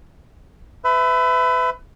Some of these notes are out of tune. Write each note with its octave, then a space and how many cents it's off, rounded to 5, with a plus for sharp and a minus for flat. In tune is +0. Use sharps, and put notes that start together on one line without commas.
B4 +30 E5 +0